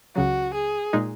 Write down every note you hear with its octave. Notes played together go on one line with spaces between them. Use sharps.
C#2 C#3 F#3 F#4
G#4
A#2 G#3 D#4